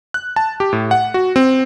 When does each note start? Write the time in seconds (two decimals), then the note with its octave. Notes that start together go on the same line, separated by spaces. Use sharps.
0.14 F#6
0.36 A5
0.60 G4
0.73 A2
0.91 F#5
1.14 F#4
1.36 C4